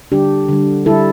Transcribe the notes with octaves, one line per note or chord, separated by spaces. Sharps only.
D3 G3 D4 G4
D3 G3
D3 G3 E4 A4